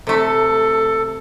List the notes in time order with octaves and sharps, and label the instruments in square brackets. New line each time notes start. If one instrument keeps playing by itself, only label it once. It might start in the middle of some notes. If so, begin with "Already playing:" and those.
[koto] C3 A3 [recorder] A4